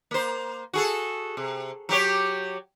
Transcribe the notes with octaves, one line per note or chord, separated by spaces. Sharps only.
A#3 C5
F#4 G#4 A4
C3
F#3 G4 C#5